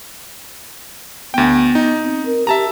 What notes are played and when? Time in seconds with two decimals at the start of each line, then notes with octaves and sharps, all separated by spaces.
1.34 D2 B3 G5
1.75 D#4
2.04 C4
2.26 A#4
2.47 G4 E5 A5 A#5